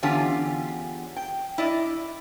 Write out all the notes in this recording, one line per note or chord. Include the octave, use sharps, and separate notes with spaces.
E2 D3 C#4 F4 G4
G5
E4 D5 D#5